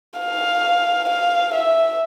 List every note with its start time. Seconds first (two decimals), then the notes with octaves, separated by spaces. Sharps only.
0.19 F5
1.09 F5
1.54 E5